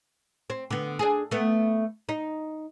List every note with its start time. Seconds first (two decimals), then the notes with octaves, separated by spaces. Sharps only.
0.50 C4
0.70 D3 B3
0.99 D4 G#4
1.31 A3 B3
2.09 D#4